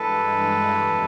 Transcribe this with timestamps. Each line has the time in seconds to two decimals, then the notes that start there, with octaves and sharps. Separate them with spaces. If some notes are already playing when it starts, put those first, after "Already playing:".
Already playing: G2 E3 G#3 A4 B4
0.74 F2 C#3 E3 G3